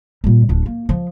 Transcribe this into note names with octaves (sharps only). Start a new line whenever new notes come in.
A#2 G3
D1 D4
A#3
F3